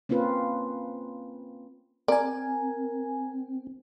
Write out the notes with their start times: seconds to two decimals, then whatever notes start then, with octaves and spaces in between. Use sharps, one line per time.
0.09 A#3 C4 C#4 F4 B4
2.08 C4 A#4 D5 G#5